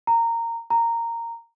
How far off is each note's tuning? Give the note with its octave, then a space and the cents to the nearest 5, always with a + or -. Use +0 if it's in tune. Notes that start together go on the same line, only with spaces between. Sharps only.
A#5 -15
A#5 -10